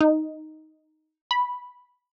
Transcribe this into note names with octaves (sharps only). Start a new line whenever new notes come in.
D#4
B5